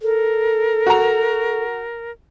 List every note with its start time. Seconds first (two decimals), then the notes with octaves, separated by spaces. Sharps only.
0.01 A4 A#4
0.87 F#4 A#5